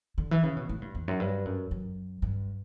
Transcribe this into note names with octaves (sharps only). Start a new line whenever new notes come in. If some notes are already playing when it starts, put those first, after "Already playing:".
D3
E3
C#3
B2
A2
G2
E2
F#2
G2
F#2
F#2
G2